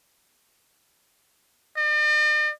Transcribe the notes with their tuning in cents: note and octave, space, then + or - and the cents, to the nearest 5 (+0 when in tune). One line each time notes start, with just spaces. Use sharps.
D5 +45